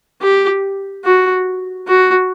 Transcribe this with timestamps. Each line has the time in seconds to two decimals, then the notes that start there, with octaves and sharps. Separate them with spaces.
0.22 G4
1.04 F#4
1.87 F#4